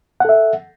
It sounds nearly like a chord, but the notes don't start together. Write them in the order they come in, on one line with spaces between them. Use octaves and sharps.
F#5 A4 E5